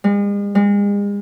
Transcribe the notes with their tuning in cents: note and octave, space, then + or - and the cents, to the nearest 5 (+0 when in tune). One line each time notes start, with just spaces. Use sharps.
G#3 -45
G#3 -40